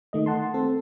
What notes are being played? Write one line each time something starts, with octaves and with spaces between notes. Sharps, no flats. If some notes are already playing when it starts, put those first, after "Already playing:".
D#3 A3 D#5
F#5 A5 C6
C4 A4